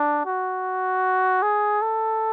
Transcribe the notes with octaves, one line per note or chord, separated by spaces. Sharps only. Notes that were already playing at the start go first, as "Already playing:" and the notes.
Already playing: D4
F#4
G#4
A4